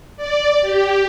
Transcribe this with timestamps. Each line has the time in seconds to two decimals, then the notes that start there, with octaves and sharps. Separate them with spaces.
0.17 D5
0.62 G4